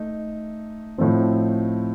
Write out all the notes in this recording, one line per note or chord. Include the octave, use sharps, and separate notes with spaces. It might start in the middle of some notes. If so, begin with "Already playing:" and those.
Already playing: A3 D#4
A2 F3 A3 C4 D#4